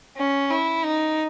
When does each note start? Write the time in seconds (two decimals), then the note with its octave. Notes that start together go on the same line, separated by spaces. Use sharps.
0.17 C#4
0.50 E4
0.84 D#4